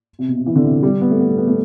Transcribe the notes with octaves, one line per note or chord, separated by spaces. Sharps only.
C3
B2
C3
E3
D3
C3
G3
B3
A3
B3
A3
B3
A3